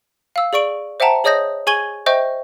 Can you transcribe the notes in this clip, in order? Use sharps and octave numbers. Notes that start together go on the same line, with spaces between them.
F5 E6
G#4 D5 C#6 D7 F#7
C5 E5 F#5 G5 A5 A#5
G#4 C#5 D#5 D#6 G6 A#6
G#4 G#5 C#6 G#6 D#7 G7
C5 D#5 E5 G5 C#6 G6